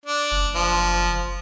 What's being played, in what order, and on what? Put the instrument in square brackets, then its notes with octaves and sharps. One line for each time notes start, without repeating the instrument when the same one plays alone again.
[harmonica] D4
[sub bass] F#1
[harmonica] F3